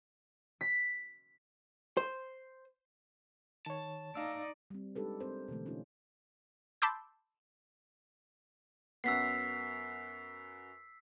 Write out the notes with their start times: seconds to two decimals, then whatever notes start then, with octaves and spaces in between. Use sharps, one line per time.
0.61 B6
1.97 C5
3.66 D#3 C#5 A5
4.15 D#4 D5 F5 E6
4.70 G3 C4
4.95 G#3 D4 D#4 G4 A4 B4
5.20 C4 A#4 C5
5.48 B2 D3 E3 A3
5.66 C#4 D#4 F4
6.82 A5 B5 C6 D6 E6 G6
9.04 F#2 B3 E6 B6 C7